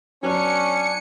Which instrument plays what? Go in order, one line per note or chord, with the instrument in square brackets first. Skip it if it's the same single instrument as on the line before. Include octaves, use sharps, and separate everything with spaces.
[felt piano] F#3 B3 [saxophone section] C#4 [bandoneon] D4 G#5 [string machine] C#7